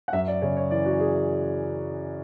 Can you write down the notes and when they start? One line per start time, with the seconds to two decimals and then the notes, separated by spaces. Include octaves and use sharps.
0.08 F#5
0.13 F#2 E5
0.28 D5
0.42 C#3 C#5
0.57 C#5
0.71 E3 D5
0.85 F#4
1.00 G#4